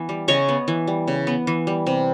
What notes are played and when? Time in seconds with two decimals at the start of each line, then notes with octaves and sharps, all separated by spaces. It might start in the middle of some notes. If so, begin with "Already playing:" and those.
Already playing: E3 B3
0.09 G3
0.28 C#3 C#5 D#5
0.49 B3
0.68 E3
0.87 G3
1.08 C#3
1.27 B3
1.47 E3
1.67 G3
1.87 C3